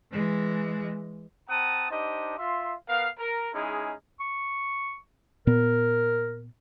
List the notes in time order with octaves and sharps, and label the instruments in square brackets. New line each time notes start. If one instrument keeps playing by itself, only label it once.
[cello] E3 G#3
[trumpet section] C4 F#5 A5 A#5 D#6
D4 D#4 G4 C5 D#5
F4 E5 C6
B3 A#4 F5
A#4
G#3 C#4 D#4 E4 G#4
[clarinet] C#6
[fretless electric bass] A#2 B3 [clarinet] A#4